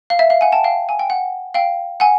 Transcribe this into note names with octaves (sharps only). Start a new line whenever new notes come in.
F5
E5
F5
F#5 G#5
G5 A5
F5 G5
G#5
G5
F#5
F5 G5
F#5 G#5